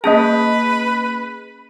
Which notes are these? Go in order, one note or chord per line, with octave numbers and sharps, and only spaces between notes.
A#3 C#4 G#4 B4 D#5 A5